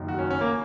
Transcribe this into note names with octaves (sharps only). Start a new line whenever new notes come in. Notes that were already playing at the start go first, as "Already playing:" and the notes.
Already playing: F#1 F#2 D#3 F#3
F#4
C#4
C#4
A#3